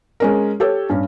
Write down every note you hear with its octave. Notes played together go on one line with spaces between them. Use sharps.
G#3 C#4 A#4
G4 A4 C#5
G2 C#4